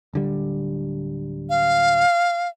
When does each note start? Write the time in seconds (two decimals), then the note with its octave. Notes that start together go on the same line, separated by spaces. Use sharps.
0.14 D1 D3 G3
1.50 F5